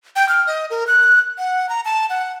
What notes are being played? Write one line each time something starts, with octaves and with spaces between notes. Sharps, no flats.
G5
F6
D#5
A#4
F#6
F#5
A#5
A5
F#5